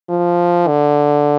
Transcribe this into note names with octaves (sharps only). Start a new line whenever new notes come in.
F3
D3